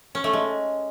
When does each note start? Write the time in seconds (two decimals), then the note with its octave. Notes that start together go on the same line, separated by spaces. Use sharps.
0.15 C#4
0.24 A3
0.33 G#3